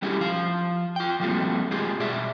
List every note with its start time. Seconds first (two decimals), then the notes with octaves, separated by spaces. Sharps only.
0.02 G3 A3 C#4 E4 F#4 G4
0.21 F3 F5
0.96 F4 G5
1.20 F3 G3 A3 A#3 C4 F#4
1.71 G#3 F4 G4 G#4
2.00 B2 D5 E5